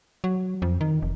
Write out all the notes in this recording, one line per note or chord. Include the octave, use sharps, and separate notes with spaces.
F#3
F2
D#3
F1